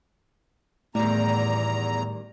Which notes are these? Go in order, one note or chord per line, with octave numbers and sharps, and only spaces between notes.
E2 A2 D#3 G3 A#5